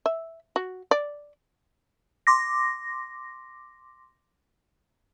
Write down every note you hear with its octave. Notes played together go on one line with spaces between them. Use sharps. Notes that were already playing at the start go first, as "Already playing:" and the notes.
E5
F#4
D5
C6 D6 A#6